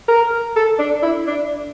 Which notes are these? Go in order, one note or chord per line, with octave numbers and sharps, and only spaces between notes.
A#4
A4
D4
E4
D4